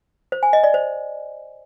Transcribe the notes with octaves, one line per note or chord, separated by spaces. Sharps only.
C5
G#5
D#5
D5
C5